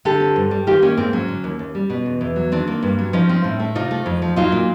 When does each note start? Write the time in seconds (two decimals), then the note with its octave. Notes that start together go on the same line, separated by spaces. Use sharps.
0.05 D3 G4 A4
0.20 C4
0.36 G2
0.51 G3
0.67 D#3 F4 G4
0.82 A#3 C#4
0.97 G#2 C4
1.13 F#3 C#4
1.28 D3
1.44 D#2
1.59 D#2
1.75 G3
1.90 B2
2.06 E2
2.21 E2
2.36 F#3
2.52 D#3 C4 D4
2.67 A#3
2.83 G2
2.99 F#3
3.13 F3 C#4 D#4
3.29 C4
3.44 A2
3.60 A3
3.75 C3 D#4 F4
3.91 A3
4.06 F2
4.22 F3
4.36 F#3 D#4 F4
4.52 A#2